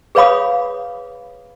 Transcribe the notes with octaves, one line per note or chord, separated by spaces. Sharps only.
G#4 B4 C#5 F5 B5 D#6